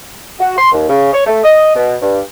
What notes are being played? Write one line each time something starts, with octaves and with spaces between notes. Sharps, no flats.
F#4
C6
D#2
C#3
C#5
A3
D#5
B2
G2